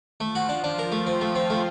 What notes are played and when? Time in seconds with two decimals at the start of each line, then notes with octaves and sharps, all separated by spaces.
0.20 F3 A3 F4
0.35 F#4
0.49 D4
0.63 F3 D4 F4
0.79 A#4
0.92 A3
1.07 C4
1.21 A3
1.35 C4
1.50 A3